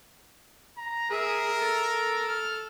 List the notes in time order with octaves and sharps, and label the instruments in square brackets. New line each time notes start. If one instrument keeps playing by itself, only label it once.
[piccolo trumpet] A#5
[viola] G#4 E5 [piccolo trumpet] A#4
[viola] A4
[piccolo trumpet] F6